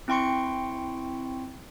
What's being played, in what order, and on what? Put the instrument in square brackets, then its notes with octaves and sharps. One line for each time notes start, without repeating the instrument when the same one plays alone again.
[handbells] C4 E4 G5 C6 C#6 C#7